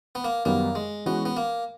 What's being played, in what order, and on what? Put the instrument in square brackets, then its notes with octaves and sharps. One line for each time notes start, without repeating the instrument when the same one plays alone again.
[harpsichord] B3
A#3
[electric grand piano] F#2 D#3 G3 B3 [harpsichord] A#3
[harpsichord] G#3
[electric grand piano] E3 G#3 C#4 F#4 [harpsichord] B3
[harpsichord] B3
A#3